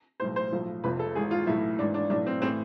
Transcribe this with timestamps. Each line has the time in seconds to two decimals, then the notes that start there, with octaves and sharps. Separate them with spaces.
0.20 B1 A2 E3 C5
0.36 C5
0.52 B1 A2 F3
0.84 F1 F2 C3 F3 B4
0.99 A4
1.15 G#1 G#2 E3 G#4
1.31 F4
1.47 B1 A2 E3 E4
1.79 G#1 G#2 E3 D4
1.94 D4
2.10 B1 A2 E3 D4
2.26 C4
2.42 A2 E3 C4